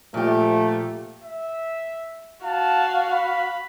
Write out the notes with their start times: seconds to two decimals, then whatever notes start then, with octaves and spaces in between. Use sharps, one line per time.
0.14 A#2 F3 A3 G4
1.23 E5
2.44 F#4 F5 A5
3.13 B5